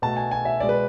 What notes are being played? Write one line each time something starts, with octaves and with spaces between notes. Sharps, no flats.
B2 A3 A5
G#5
G#5
E5
B2 G#3 D5
B4